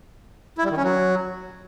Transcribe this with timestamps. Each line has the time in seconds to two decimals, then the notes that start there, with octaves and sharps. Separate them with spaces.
0.58 E4
0.64 G3
0.71 D#3
0.77 C#4
0.84 F#3